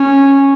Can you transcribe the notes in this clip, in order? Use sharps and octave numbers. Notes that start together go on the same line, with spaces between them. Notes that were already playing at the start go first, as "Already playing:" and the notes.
Already playing: C#4